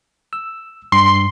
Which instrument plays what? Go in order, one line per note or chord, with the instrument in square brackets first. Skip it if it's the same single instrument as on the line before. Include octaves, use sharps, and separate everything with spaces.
[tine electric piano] E6
[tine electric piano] G2 [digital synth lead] C6